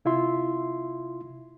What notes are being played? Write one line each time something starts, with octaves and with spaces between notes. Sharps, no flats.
C3 E4 F4 E5 C6